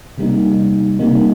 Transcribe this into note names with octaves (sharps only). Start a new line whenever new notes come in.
C3 G3 A#3 D#4
C3 G3 A#3 D#4